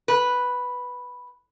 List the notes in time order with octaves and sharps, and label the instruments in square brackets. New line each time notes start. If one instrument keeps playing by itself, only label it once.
[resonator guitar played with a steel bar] B4